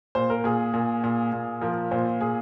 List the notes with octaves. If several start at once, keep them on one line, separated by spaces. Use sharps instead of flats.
A#2 C5
A#4
A#2 G#4
A#2
A#2
A#2
F3 A#4
A#2 C5
A#2 G#4